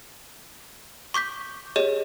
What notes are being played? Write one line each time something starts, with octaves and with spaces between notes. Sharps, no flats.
C#6 D6 G6 B6
G4 G#4 C#5 D#5